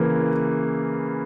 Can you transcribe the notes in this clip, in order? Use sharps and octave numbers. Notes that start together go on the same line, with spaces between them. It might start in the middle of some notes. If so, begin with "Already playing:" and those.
Already playing: C#3 E3 A#3